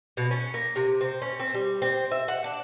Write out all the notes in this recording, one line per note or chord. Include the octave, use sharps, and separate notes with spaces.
B2
C#4
A#3
C3
C4
C#4
C4
G3
C4
E5
F#5
D4